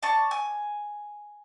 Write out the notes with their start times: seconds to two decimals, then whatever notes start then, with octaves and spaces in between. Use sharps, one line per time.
0.03 D5 A5 C#6
0.31 G#5